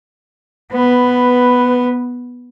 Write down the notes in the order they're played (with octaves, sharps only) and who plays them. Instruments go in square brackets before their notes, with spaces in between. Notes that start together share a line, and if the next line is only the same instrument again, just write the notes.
[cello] B3 [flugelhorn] B4